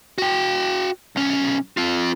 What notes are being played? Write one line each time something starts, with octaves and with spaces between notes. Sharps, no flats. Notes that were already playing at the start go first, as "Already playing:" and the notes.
F#4 G5
B1 C#4
C4 F4